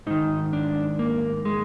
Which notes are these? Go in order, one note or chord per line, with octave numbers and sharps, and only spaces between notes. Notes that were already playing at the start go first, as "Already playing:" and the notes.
G#2 D#3 D#4
D4
A#3
G#3